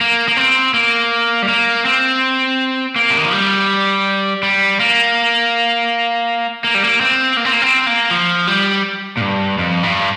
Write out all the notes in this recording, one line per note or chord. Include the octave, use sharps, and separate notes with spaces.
A#3
A#3
C4
A#3
G3
A#3
C4
A#3
C3
D#3
F3
G3
G3
A#3
A#3
G3
A#3
C4
A#3
C4
A#3
C4
A#3
F3
G3
A#2
G2
F2
G2